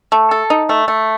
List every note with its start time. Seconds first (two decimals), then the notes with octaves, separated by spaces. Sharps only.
0.12 A3
0.31 A4
0.50 D#4
0.69 A3
0.88 A3